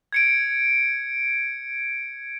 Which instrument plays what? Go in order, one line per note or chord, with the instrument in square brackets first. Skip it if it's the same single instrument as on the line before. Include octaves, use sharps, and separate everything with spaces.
[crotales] G#6 C#7 D7